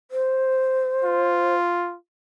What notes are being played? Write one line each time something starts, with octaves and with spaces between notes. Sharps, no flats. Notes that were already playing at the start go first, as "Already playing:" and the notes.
C5
F4